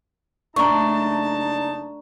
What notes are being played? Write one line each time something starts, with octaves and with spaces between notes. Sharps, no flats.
F#1 A3 D4 D#4 A5 A#5 C#6